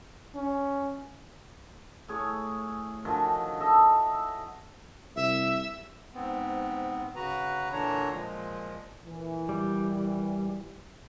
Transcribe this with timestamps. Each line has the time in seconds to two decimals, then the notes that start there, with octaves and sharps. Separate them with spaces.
0.35 C#4
2.08 A2 G#4 C#5
3.05 D3 D#3 F3 F#3
3.60 A4 D#5 E5
5.16 C2 E5
6.14 G#2 B3 C4
7.16 C#3 F#4 B4 A#5
7.72 A#2 D3 E3 D4 C#5 A#5
8.12 A#2 F3 G#3
9.07 A#2 E3
9.49 G3